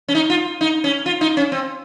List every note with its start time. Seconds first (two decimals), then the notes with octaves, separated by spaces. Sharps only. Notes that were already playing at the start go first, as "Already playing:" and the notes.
0.08 C#4
0.15 D#4
0.30 F4
0.61 D#4
0.84 C#4
1.06 F4
1.21 D#4
1.37 C#4
1.52 C4